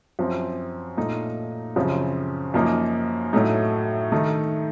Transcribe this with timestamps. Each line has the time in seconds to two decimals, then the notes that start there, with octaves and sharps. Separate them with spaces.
0.19 F#2 F3 C4
0.97 A#2 A3 D#4
1.76 F#2 C#3 F3 C4
2.54 F#2 F3 A#3 D#4
3.33 A2 F#3 A3 D#4
4.12 D#3 A3 D#4